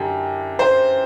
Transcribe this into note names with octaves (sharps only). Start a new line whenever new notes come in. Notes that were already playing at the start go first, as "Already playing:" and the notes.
Already playing: F#2 D3 G4
C5